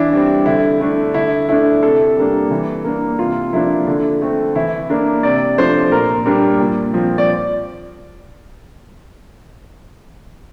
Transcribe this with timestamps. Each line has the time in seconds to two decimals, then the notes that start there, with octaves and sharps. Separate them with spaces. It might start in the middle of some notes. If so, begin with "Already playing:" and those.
Already playing: E3 D4 E4
0.12 G3 C4
0.46 D3 E4
0.80 A3 D4
1.14 D3 E4
1.49 A3 D4 E4
1.83 C3 A4
2.16 G3 A#3 D4
2.51 E3
2.84 A#3 D4
3.19 C3 F4
3.53 F3 A#3 D4 E4
3.87 D3
4.21 A3 C4
4.55 E3 E4
4.90 A#3 D4
5.23 C3 D5
5.58 F3 A3 D4 C5
5.92 A#2 A#4
6.26 G3 A#3 D4
6.60 A#2
6.94 F3 C4
7.18 D5